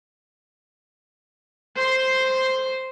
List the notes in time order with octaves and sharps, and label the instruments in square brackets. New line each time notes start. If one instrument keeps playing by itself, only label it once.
[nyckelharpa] C5 C6